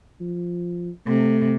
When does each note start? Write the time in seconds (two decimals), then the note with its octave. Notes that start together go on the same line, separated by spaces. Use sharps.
0.21 F3
1.07 C3 A3